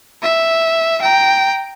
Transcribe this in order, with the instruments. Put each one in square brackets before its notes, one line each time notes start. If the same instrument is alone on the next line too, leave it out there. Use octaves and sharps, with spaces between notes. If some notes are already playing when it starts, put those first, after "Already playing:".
[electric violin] E5
G5 A#5